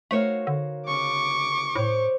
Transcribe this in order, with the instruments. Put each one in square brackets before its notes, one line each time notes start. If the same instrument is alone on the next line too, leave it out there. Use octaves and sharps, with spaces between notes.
[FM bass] A3 [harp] D#4 A#4 F5 [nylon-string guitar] F#4 C5 C#5
[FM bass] D3
[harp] C#3 [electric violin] C#6 D6
[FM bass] A2 [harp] C5 C#5